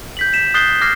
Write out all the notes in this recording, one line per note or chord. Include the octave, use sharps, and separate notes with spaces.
G6 B6 F#7
B6 E7
D#6 F#6 G6 A6 C7 G7
D6 F6 G#6 A#6 C7